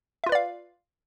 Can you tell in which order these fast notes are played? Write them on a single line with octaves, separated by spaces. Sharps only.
E5 F4 B4 D5 F5